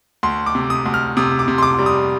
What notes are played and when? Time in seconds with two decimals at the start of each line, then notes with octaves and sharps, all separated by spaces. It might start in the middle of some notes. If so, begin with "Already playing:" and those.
0.23 D2 C6
0.46 D6
0.55 C3
0.70 D#6
0.86 D2
0.94 F6
1.17 C3 D#6
1.39 D6
1.48 C3
1.58 C6
1.63 D6
1.79 G3
1.86 D#6